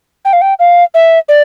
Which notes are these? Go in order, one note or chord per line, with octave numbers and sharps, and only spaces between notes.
G5
F5
G5
F5
E5
D5